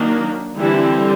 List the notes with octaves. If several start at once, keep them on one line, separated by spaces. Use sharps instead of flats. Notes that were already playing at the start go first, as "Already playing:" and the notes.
Already playing: D#3 F#3 A#3 D4
D3 E3 G3 C4 E4